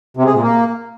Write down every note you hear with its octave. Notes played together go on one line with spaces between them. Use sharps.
C3
G#3
A#2
A#3